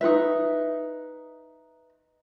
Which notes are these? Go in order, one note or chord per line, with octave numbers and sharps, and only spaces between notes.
D#4 F4 B4 E5